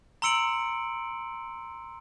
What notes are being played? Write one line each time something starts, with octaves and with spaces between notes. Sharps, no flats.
A#5 C6 E6 C#7 D7 F#7